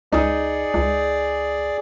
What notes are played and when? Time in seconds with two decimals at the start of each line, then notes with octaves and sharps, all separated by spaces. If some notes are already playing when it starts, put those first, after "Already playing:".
0.12 C#2 D#4 G#4 D5 D#6
0.74 C#2